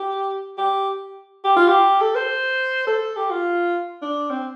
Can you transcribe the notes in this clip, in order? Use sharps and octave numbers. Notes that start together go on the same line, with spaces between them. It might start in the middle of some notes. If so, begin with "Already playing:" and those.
Already playing: G4
G4
G4
F4
G4
A4
C5
A4
G4
F4
D4
C4